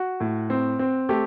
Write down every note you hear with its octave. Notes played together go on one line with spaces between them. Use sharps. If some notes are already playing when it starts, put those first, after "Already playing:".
Already playing: F#4
A2
C4
C4
A3 G4